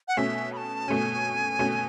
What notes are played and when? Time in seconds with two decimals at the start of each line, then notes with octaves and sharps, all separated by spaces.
0.08 F#5
0.17 B2 A3 C#4 E5
0.52 B5
0.57 A5
0.88 B2 A3 C#4 G#5
1.59 B2 A3 C#4